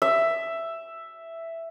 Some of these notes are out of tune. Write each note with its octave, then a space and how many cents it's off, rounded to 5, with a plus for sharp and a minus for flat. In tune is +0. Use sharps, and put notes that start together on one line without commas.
E5 +5